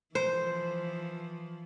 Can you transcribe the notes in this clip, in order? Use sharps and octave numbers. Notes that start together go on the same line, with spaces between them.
E3 F3 C5